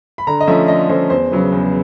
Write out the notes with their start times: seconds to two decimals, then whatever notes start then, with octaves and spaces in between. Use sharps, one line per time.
0.18 B5
0.27 D3 A#5
0.41 D#5
0.47 F3 A3 C#4 E5
0.68 D3 D#5
0.89 F3 A3 C#4 C5
1.10 E2 C5
1.32 C#3 F#3 B3
1.52 E2